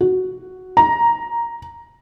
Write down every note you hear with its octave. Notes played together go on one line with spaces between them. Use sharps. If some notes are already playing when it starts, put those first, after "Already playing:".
F#4
A#5